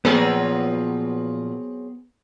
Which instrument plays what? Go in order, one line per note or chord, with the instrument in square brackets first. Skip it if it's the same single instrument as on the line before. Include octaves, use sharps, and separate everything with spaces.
[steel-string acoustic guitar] A#2 F3 B4 [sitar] F#3 C4 G#4 [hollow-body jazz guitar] B3